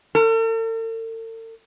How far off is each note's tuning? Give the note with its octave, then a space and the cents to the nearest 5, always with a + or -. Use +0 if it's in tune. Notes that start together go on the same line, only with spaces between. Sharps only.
A4 +45